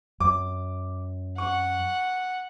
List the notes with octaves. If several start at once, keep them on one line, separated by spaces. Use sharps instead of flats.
F#2 D6
F#5 C#6